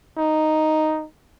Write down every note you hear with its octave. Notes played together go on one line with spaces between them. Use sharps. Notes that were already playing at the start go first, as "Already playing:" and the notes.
D#4